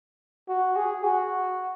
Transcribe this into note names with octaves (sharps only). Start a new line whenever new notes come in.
F#4
G#4
F#4